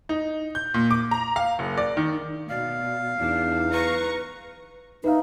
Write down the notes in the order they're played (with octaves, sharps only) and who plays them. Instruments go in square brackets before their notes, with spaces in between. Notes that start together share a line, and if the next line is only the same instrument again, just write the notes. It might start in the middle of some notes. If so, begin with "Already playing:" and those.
[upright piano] D#4
G6
A#2
D6
A#5
F5
F#1
D5
D#3
[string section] B2 [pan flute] D5 [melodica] F5
[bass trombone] E2 [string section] D4 [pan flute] D#4
[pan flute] B4 [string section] A#5 C#6
[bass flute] D#4 [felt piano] B4 E5 F5